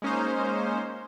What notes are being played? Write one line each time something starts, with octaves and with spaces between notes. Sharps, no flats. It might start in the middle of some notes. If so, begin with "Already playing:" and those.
G#3 A#3 C#4 D#4 C5